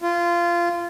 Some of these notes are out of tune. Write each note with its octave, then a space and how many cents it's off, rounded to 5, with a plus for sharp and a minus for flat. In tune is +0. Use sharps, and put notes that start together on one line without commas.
F4 -20